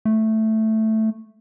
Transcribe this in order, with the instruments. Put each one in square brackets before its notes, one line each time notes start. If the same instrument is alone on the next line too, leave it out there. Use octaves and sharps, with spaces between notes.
[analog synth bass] A3